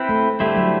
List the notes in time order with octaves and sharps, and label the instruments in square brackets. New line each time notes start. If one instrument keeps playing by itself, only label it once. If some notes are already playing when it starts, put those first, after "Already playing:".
Already playing: [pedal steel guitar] C4 E4 B4
[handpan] A3
[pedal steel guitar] D3 A3 E4 G4 C5 [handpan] G3
[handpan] F#3